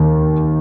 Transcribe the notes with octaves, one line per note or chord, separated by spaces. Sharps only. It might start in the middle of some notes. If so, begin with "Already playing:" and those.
Already playing: D#2 D#3